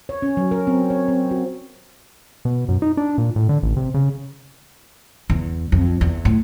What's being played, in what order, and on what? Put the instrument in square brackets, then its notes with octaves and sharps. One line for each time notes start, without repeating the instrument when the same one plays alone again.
[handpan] C#5
C#4
F#3
A#4
C4
C#5
C4
F#4
[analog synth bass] B2
F#2
D#4
D4
A#2
A2
D3
A1
C3
C#3
[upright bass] E2
F2
E2
A2